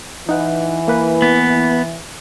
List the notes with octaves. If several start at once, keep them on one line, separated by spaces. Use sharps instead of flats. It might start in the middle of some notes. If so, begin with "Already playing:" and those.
E3 D#4 F#5
A#3 B4
B3